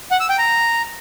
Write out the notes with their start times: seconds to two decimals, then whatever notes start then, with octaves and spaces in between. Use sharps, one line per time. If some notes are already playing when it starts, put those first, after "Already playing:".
0.11 F#5
0.20 E6
0.29 G5
0.38 A#5